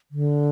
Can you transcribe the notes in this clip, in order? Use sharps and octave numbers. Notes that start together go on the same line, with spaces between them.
D3